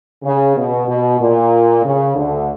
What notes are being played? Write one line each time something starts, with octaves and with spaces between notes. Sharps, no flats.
C#3
B2
B2
A#2
C#3
D2 D3